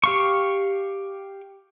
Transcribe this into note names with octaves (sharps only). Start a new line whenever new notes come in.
G4 F5 C#6